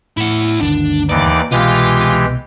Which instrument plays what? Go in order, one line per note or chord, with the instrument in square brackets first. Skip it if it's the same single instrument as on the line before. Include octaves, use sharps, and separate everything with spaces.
[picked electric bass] A2 [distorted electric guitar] E4 F#5
[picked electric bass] G1 D2 D#3 [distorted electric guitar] D4
[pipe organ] D#2 E3 D#4 [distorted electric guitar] D5
[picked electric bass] C2 B2 B3 [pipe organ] E3 G#3 G4 [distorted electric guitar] F4